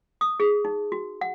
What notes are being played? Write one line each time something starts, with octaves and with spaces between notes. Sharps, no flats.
D#6
G#4
D#4
F#4
F#5